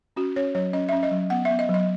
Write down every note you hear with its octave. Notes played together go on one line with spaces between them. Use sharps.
C#4 F#4
C#4 C#5
F#3 C#5
C#4 D#5
C#4 E5
D#5
F#3
B3 F#5
B3 E5
D#5
F#3
D#5